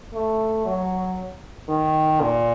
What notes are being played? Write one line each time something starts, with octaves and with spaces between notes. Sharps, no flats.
A3
F#3
D#3
A#2